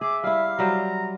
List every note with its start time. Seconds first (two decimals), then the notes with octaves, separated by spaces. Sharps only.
0.01 G#4 E5 D6
0.24 G3 E4 F5
0.59 F#3 G3 C5 A#5